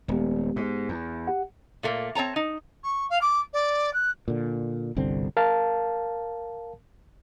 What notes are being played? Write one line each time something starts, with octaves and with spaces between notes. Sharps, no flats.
D#1 G#3 B3 G4
G#2
E2
G4 F#5
A#2 A3 A#3
C4 C#5 A5 A#5
D#4
C#6
F5
D6
D5
F#6
A#2 D3
G1 C2 D3 C4
A#4 F5 A5